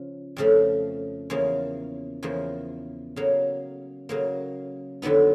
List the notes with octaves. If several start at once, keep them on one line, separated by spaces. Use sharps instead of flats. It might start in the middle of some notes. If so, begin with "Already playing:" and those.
Already playing: C#3 F3
F2 C#3 F3 A3
E2 C#3 F3 A#3
E2 C#3 F3 A#3
C#3 F#3 A#3
C#3 F#3 A#3
F2 D3 F#3 B3 D#4